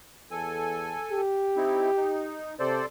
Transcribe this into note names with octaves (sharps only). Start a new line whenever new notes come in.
E2 A4 G#5
G4
C4 D#4 E4
D#4
C3 A4 C5 D5